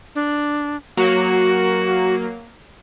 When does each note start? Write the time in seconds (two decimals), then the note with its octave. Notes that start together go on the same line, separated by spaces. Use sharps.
0.15 D4
0.97 F#3 A#3 F#4